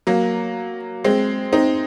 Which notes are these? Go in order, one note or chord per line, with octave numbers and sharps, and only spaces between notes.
F#3 A#3
G#3 C4
C4 D#4